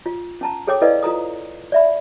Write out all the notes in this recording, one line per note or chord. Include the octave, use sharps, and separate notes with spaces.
F4
C#4 A5 A#5
G#4 A4 C#5 G5 D6
E4 A4 B4 D5 D#5 F5
F4 A4 A#5 D#6
D5 E5 B5